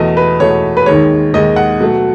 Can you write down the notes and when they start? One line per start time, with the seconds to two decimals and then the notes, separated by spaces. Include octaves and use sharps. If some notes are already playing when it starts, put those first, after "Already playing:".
Already playing: E2 B2 A3 D#5
0.17 B4
0.40 E2 B2 A3 C#5
0.77 B4
0.86 D#2 D#3 G#3 C#5
1.34 D#2 D#3 G#3 D#5
1.56 F#5
1.80 B2 F#3 A3